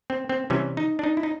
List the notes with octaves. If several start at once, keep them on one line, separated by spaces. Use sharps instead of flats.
C4
C4
C3 E3 G3 C#4
D#4
D4
D#4
E4
D#4